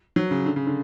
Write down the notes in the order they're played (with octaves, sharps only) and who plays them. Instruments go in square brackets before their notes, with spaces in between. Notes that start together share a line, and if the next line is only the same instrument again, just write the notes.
[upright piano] F#3
C#3
D3
C#3
D3